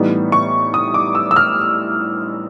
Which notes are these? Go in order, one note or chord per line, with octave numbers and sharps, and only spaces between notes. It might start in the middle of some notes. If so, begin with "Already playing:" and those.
Already playing: A2 E3 G3 B3 D#4
C#6
D#6
D6
E6
E6
F6